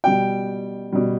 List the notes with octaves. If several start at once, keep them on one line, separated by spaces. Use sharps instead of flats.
B2 G3 G5
B2 G3